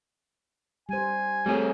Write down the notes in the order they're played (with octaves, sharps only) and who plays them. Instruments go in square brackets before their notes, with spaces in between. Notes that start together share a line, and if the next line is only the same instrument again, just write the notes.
[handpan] G3 C5 [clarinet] G#5
[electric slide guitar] G3 C4 G#4 [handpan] A3 C#5